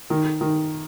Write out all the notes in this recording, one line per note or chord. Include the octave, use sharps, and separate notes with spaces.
D#3
D#3